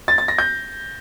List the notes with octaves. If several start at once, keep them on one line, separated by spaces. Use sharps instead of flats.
A6
A6
A#6
G6